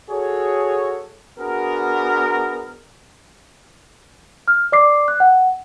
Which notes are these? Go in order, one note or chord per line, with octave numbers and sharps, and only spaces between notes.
F#4 G#4 A4 C#5
B3 D4 F#4 G#4 A#4
F6
D5 D6 C7
F#6
F#5